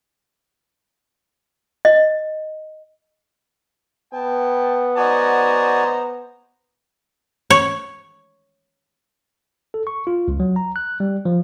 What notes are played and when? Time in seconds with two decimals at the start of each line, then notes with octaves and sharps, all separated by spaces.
1.85 D#5
4.13 B3 G5 A5
4.97 F#4 C5 D5 D#5 G#5 A#5
7.50 C#5
9.74 A4
9.87 C#6
10.07 F4
10.28 C#2
10.40 F#3
10.56 A#5
10.76 F#6
11.00 G3
11.25 F3